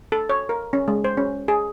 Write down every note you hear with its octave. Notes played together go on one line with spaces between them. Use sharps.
A4
C#5
A#4
C#4
G#3
C5
C#4
G#4